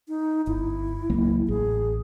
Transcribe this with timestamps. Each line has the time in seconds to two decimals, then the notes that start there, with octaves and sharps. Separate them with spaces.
0.08 D#4
0.47 G1 E4
1.10 C#2 F#3 A#3
1.48 A1 G#4